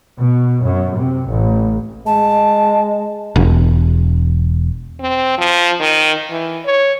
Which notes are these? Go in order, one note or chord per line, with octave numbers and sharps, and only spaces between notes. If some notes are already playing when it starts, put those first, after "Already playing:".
B2
F#2
C3
A1
G#3 A5
E1
C4
F3
D#3
E3
C#5